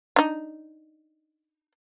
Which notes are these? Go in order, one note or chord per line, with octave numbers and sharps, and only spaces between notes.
D4 D#4